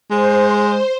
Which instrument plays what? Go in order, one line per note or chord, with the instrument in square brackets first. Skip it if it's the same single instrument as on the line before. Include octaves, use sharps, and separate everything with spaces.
[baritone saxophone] G#3 [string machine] C5